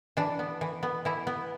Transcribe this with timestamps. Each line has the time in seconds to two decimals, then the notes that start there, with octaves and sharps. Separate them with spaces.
0.17 E3 D4
0.39 B3
0.61 E3
0.83 B3
1.05 E3 E4
1.27 B3